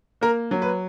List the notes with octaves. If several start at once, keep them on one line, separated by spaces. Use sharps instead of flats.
A#3 A#4
F#3
B4